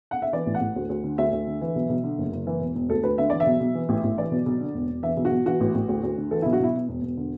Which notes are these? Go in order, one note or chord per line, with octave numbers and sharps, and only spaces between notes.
F#5
E5
E3 D5
A1
F#5
A1
D2
D2
D3
D2 E5
D2
D3
E3
B1
B1
D3
F#1
F#1
E3
E1
E1
D2 A4
D2 B4
D3 E5
E3 D5
E5
B1
B1
E3
A1
A1
E3 D5
B1
B1
D3
E1
E1
E3 E5
B1
F#4
B1
E3 F#4
A1
A1
D2
D2
D3
E3 A4
B1 E4
F#4
B1 E4
B2
E1
E1
D3